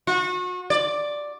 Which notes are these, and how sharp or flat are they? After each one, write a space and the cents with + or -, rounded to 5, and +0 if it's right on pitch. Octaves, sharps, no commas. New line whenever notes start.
F#4 -35
D5 +5